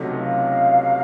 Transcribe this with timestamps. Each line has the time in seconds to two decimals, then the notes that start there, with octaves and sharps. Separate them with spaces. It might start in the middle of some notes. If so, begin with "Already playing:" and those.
Already playing: C#2 C3 F#3 A3 D#4
0.20 F5